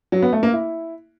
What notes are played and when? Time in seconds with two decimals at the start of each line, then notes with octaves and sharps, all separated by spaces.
0.12 F#3
0.22 B3
0.33 A3
0.43 A#3
0.53 E4